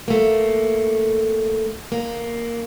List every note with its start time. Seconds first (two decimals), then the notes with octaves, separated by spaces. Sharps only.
0.08 A3 A#3
1.92 A#3